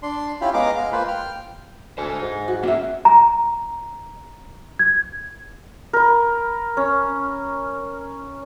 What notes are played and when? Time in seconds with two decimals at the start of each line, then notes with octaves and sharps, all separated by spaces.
0.03 D4 C6
0.41 C#4 E4 F4 G4 F5 B5
0.54 G#3 B3 D#5 F5 A#5 D6
0.76 G#3 F5
0.92 A#3 F4 B4 C5 B5
1.08 G5 F6
1.98 D2 C5 G#5
2.22 G#2
2.48 F#4
2.63 A#3 C#4 F#4 G#4 E5
3.05 A#5
4.79 G#6
5.93 A#4 B5
6.77 C#4